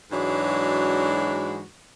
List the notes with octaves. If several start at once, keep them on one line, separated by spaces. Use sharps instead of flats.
G#2 E3 F#3 G#3 D4 F#4